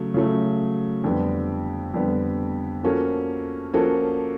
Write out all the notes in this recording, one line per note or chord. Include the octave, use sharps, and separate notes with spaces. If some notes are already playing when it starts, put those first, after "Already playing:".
Already playing: C#3 F#3 A3
C#3 F#3 A3
F2 D3 G3 B3
F2 D3 G3 B3
F3 A#3 C#4 F#4 A4
F3 A#3 C#4 F#4 A4